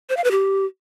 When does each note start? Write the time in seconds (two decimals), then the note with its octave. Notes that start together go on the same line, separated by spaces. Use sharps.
0.10 C5
0.17 F5
0.24 B4
0.31 G4